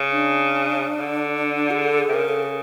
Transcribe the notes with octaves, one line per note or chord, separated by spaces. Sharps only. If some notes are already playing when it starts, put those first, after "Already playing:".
Already playing: C#3
D4
D3
D4
G#4
A4
G#4
C3
C#3 A#4
A4
G#4